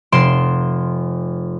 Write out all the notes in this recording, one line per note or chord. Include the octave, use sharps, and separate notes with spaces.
F1 C6 D7 E7